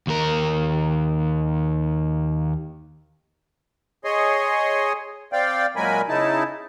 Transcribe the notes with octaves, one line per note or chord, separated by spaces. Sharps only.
D#2 A#4
G#4 C#5 D#5 C6
C4 D5 F5 G5
A#2 F#3 G#3 A#4 G#5 B5
C#3 D#4 E4 A5